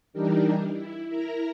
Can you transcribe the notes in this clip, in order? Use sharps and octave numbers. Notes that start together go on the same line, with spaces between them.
E3 G3 D4 D#4 G4 A#4
E4
E4 A#4 A#5